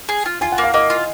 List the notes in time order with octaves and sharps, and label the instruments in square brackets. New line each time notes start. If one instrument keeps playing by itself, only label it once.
[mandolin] G#4
F4
[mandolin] F4 [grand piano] G#5
[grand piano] F#5
[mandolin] A#3
[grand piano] F5
[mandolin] A#3 [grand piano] D#5
[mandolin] F4